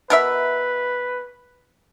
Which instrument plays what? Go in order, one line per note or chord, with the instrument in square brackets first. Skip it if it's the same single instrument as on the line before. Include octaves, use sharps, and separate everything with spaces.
[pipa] B2 A#4 E5 [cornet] B4